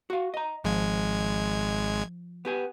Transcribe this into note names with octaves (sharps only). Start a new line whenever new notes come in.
F#4 F5
D#5 A#5
G#1 F3 G#3 G#6
B3 G4 G#5